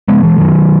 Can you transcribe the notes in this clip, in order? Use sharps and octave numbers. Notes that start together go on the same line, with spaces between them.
C#3 G#3 B3
E3 G#3
F#2 D#3 F#3